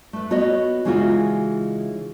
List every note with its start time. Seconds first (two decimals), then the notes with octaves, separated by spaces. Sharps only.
0.13 A3 B4
0.31 B3 F#4 C#5 D#5
0.85 C#3 E3 G#3 D#4 F4 F#4